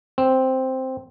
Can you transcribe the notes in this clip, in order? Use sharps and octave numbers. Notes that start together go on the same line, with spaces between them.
C4